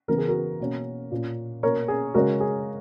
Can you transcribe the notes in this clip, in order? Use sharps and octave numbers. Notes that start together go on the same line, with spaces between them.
C#3 E3 B3 A#4
G#4
F#4 A#4
B2 A#3 C#4
A#2 A#3 C#4
B2 A#3 C#4 A#4 C#5
G#4
C#3 G#3 C#4 F#4 A#4
G#4